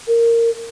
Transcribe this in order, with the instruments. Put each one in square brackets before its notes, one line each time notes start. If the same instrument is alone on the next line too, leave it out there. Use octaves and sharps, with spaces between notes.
[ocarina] A#4